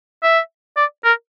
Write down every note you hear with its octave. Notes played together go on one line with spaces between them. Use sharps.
E5
D5
A#4